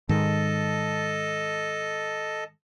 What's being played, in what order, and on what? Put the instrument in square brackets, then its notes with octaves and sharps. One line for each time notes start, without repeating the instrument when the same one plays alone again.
[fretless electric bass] G#2 D#3 [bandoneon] A4 D#5 A5